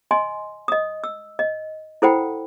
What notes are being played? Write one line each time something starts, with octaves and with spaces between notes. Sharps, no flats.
D#5 G#5 C6
D#5 D#6
E6
D#5
E4 A4 C5 F#5 G5 B5